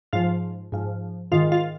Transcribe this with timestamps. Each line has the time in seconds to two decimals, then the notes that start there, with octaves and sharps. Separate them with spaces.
0.13 G#2 F3 F4 F5
0.72 G#2 F3
1.32 G#2 D#3 F4 F5
1.52 F4 F5